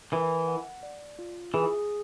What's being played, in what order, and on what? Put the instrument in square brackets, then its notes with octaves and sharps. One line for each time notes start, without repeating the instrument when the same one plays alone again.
[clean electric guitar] E3 [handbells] A#4
[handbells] F#5
D5
F4
[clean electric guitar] E3 [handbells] G#4